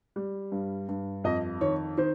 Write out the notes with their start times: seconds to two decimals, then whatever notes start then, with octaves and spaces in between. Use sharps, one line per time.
0.16 G3
0.52 G2
0.89 G2
1.24 F2 D#5
1.61 D#3 C#5
1.98 D#3 C5